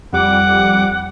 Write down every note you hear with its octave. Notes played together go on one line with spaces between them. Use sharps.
F2 G3 F#5 D6